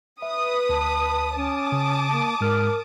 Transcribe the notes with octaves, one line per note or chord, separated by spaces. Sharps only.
B4 E5 D#6
D2 A5
C#4 A5 D6 D#6
C#3
A#3
G#2 G#3 A#4 F6